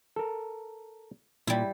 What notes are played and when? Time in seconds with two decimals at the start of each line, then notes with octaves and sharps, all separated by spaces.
0.16 A4 A#4
1.47 A#2 G3 E4